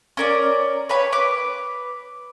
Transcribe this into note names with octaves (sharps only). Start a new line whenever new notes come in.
C#4 A#4 D5
B4 C#5 B5
B4 D6